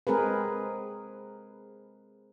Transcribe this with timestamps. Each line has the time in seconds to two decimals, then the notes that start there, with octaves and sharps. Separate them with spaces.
0.07 G#3 C4 G#4 A#4 B4